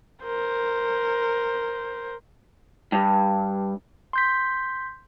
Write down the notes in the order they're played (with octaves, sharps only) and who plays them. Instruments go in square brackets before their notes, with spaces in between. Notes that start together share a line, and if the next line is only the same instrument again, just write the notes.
[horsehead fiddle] A#4 C5
[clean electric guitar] G2
[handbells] C6 G6 B6